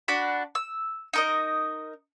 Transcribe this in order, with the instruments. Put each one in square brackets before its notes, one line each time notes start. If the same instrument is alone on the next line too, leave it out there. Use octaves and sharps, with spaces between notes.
[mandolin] D4 F#4 B5
E6
D#4 A#4 D#5